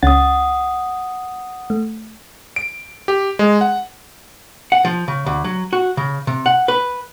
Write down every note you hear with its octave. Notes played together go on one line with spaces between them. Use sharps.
C#2 C#4 F#5 D#6 A6
A3
D7
G4
G#3
F#5
F#5
F3
C#3
D2
F#3
F#4
C#3
C3
F#5
B4